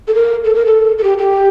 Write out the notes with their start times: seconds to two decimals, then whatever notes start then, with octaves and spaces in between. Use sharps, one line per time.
0.08 A4
0.15 A#4
0.44 A4
0.55 A#4
0.66 A4
0.98 A4
1.04 G4
1.18 G4